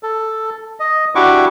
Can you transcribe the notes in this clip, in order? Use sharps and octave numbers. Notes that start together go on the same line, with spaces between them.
A4
D#5
D4 E4 F#4 G4 C#6 D6